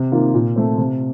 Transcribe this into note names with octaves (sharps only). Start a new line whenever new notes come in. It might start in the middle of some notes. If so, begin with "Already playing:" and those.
Already playing: C3
D#3 A#3 F4
A#2
A3 C4
C3